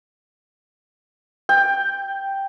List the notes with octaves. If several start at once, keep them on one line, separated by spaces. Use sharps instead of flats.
G5